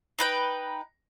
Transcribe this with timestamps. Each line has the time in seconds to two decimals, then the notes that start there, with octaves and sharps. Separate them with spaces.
0.19 D#4 B4 G5